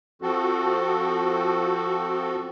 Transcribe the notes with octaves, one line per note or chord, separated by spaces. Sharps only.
F3 C4 F#4 A4